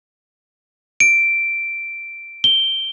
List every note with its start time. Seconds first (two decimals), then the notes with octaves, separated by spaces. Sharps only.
1.00 D7
2.44 G7